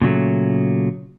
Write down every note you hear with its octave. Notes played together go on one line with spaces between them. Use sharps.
A#2 C#3 F#3 A3